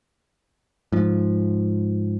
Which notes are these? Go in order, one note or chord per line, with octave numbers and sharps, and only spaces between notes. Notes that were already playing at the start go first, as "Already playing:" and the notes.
G#2 F3